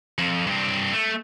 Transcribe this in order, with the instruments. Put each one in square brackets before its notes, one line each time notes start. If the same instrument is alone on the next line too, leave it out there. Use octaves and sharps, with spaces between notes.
[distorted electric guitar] F2
G2 C4
A3